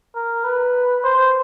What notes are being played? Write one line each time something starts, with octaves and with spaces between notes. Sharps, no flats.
A#4
B4
C5